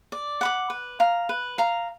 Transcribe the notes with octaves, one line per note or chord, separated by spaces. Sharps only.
D5
F#5 B5 D6
B4
F5 A#5
B4
F5 A#5